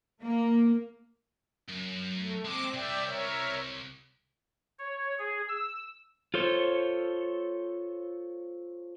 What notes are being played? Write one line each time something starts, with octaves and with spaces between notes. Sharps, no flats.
A#3
F#2
A3
G#3 C4 A4 D6
C2 D5 E5 G5
A#4 C#5 E5
C#5
G#4
E6
F4 A4 C5 C#5